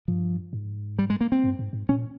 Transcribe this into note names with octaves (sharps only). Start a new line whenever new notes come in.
G2 F3
G#2
G3
G#3
A#3
C4
G2
G#2
G#2
A#2 C#4